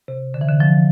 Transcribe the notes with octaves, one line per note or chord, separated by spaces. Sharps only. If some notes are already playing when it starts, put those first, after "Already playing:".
C3
D3
E3
D3
F3